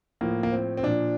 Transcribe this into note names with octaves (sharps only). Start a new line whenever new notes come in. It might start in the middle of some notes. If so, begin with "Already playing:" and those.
A2 F3 A#3
A#3
C4
C4
A#2 F3 D4